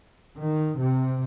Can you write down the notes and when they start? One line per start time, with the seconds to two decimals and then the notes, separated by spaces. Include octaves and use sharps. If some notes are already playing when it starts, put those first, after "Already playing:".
0.36 D#3
0.78 C3